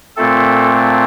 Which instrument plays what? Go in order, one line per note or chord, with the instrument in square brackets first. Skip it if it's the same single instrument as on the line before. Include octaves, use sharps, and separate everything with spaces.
[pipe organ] A#2 A3 C4 A4